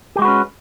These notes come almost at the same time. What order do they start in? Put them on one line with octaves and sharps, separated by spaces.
G4 G#3 F#4 B4 C#4